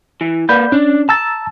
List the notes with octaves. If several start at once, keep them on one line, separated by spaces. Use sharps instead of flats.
E3
A#3 B4 D5 B5 G6
C#4 D4
A5 A#5 E6 A6